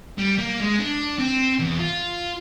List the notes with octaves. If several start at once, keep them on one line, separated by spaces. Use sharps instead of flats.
G3
A#3
G#3
D4
C4
E2
F4